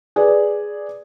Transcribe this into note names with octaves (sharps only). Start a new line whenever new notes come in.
G#4 B4 D5